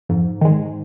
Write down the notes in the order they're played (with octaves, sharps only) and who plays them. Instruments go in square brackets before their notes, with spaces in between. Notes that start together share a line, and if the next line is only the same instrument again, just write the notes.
[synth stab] F2 [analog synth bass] G#2
[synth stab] D#3 G#3